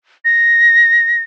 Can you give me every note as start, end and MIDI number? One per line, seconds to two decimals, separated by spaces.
0.25 1.22 94